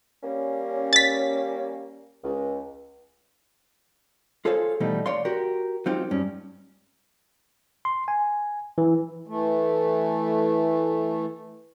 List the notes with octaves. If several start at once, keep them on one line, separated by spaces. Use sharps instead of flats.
G3 A#3 C#4
A6 B6
C#2
F4 G#4 A4 C5 C#5 F5
B2 E3 G3 A3 D#4
C#5 D5 F5 C6
F#4 G4 A#4
F#3 C4 D#4 F4 G4
G2 C#4
C6
G#5
E3
E3 A3